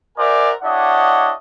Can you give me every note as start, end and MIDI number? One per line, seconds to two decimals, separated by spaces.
0.17 0.52 66
0.17 0.52 70
0.17 0.52 72
0.17 0.52 74
0.17 0.52 76
0.17 0.52 80
0.63 1.32 62
0.63 1.32 64
0.63 1.32 67
0.63 1.32 73
0.63 1.32 75
0.63 1.32 78